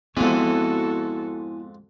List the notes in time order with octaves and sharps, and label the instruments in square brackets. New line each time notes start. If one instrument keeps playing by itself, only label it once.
[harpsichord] F2 G#2 [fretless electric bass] B3 C4 [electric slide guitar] E4 G#5 [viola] F#4 A4